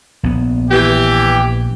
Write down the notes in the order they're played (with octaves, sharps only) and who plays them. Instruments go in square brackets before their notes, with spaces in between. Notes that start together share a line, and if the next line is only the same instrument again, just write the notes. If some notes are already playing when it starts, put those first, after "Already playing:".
[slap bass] A#1 B3
[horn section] E3 G4